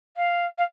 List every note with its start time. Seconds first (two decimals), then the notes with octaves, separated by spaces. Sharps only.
0.16 F5
0.58 F5